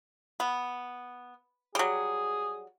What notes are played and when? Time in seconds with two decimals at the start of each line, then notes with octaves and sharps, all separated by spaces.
0.40 B3
1.75 F#3 G3 G#4